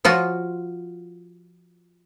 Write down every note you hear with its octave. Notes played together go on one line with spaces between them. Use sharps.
F3 F4 F#4